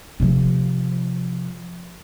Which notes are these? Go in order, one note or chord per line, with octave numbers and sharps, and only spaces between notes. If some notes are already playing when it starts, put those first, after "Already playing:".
C3 F3